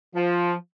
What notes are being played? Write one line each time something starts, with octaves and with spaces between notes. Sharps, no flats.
F3